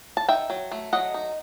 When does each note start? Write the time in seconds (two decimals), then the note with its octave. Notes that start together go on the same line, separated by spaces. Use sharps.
0.17 A5
0.28 D#4 E5 G5
0.50 F#3
0.72 A3
0.93 F#3 D#5 F#5
1.14 D#4